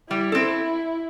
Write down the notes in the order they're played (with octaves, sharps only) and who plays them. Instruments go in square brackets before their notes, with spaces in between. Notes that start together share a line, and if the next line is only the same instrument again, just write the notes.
[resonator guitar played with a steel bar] G3 [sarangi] E4
[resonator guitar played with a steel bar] C4 A4